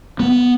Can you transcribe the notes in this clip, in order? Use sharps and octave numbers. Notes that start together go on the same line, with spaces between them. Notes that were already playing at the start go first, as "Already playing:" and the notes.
B3